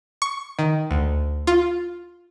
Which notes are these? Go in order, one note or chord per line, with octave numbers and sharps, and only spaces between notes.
C#6
D#3
D2
F4